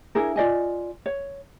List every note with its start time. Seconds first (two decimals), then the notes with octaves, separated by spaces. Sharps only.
0.15 D4 E4 G#4 A#4
0.36 F4 D5 D#5 G#5
1.06 C#5